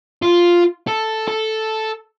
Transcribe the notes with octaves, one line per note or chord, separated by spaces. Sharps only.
F4
A4
A4